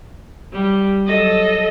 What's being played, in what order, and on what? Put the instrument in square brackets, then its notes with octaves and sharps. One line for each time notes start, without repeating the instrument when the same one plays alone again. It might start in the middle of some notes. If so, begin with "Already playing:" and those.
[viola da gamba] G3
[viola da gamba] F#3 [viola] A4 D#5